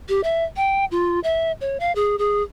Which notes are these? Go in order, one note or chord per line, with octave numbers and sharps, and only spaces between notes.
G4
E5
G5
F4
E5
C#5
F5
G#4
G#4